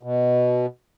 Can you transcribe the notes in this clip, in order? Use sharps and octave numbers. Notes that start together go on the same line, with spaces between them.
B2